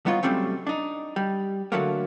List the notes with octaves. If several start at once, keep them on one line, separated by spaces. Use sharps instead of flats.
G3 B3 D#4 F4 C#5
C3 F#3 G3 A3 C4 C#4
D4 D#4
G3
D3 F#3 A3 A#3